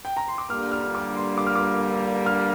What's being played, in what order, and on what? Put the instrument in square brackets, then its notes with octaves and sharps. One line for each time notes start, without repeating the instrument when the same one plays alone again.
[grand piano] G5
A#5
C6
D6
[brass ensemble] G2 D3 G3 A#3 [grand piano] F6
[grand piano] F6
D6
C6
D6
F6
D6
F6